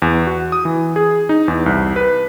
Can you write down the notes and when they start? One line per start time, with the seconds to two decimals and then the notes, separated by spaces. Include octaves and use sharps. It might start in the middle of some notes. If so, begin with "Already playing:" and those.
0.02 E2
0.27 F#4
0.52 D#6
0.65 E3
0.96 G#4
1.29 D#4
1.48 E2
1.66 C2
1.96 B4